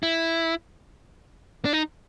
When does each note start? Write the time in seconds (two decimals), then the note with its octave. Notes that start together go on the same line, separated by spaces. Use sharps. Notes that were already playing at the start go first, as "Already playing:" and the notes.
0.03 E4
1.65 D4
1.73 D#4